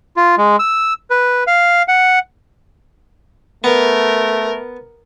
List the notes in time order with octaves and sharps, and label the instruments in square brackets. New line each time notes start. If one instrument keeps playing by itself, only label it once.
[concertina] F4
G#3
E6
B4
F5
F#5
[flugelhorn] A3 [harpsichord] B3 [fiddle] A#4